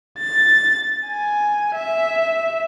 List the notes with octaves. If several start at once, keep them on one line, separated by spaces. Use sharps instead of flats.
A6
G#5
E5